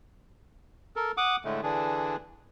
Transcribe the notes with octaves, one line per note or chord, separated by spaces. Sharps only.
A4 A#4
F#5 D6 D#6
A2 D3 G#3 A3
D3 E3 D4 G#4